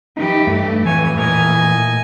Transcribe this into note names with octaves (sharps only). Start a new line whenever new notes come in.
E3 D#4 G4
G2 A3
F2 A2 E3 C#5 G#5
A#2 A3 A#4 D#5 G#5